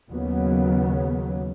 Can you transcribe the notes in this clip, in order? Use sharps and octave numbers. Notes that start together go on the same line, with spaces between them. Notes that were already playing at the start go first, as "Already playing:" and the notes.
D#2 C#3 F#3 B3